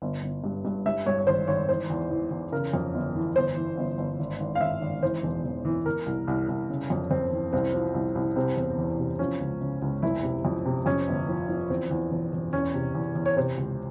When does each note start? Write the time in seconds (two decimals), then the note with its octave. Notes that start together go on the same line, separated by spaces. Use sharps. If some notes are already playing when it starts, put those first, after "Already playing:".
0.02 G1
0.22 G1
0.44 G2
0.65 G2
0.86 G2 E5
1.06 G2 C#5
1.19 C#5
1.27 G#1 C5
1.48 G#1 C#5
1.69 E3 C5
1.90 E2
2.10 E3
2.31 E2
2.52 C#3 A#4
2.74 F2
2.94 G1
3.15 E3
3.36 G1 C5
3.56 E3
3.77 G1
3.98 G1
4.19 G#1
4.40 G#1
4.55 F5
4.60 G#1 E5
4.82 G#1
5.02 E3 C5
5.23 E1
5.44 E1
5.65 E3
5.86 E3 A#4
6.06 C2
6.28 C2
6.48 C2
6.69 C#3
6.90 F2
7.11 F2 C4
7.31 E3
7.53 C2 C4
7.73 F3
7.94 C2
8.15 C2
8.36 C3 C4
8.57 E1
8.78 E2
8.99 C3
9.19 F3 C#4
9.40 C#2
9.61 C#3
9.82 C#2
10.02 F1 E4
10.23 C3
10.45 F2
10.66 C3
10.86 F2 C#4
11.08 G1
11.28 F3
11.49 F3
11.70 E2 C4
11.91 E2
12.11 E1
12.32 E1
12.53 E2 C#4
12.74 C3
12.95 E2
13.15 E2
13.26 C#5
13.37 C3 C5
13.57 C#2